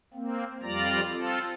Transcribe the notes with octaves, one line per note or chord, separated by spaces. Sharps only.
A#3 C4
F2 G3 F4 D5 A#5
C4 F4 A4